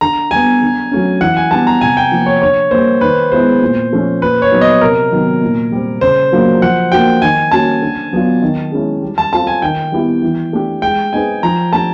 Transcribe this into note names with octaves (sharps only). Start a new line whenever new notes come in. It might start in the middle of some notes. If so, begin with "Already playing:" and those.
D3 A#5
G3 B3 G#5
D3
F#3 A3 C#4
E3 F#5
G#5
G3 B3 D4 G4 A5
A#5
C3 G#5
G5
F3 A#3
C#5
D3 C#5
G3 A#3 C5
D#3 B4
G#3 B3 E4 G#4 C5
A#2
F3 A3 C#4
A#2 B4
C#5
F#3 B3 D#4
D#5
C3 A#4
D#3 F#3 B3
A#2
G3 C4
C#3 C5
F#3 A#3 D4 F4
F3 F#5
A#3 D4 F#4 G5
D#3 G#5
G3 A#3 C#4 F#4 A5
D3
F#3 B3 D4 F4
D#3
G#3 C#4 E4
G3
A5
C4 F4 A4 A5
G#5
D#3 G5
G3 B3 E4 G4
E3
A3 D4 G4
G#3 G5
C4 D#4 G#4 B4 G#5
F3 A#5
A3 D4 G4 A5